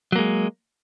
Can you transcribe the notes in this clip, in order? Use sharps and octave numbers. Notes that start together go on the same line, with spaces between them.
F#3 G#3 A#3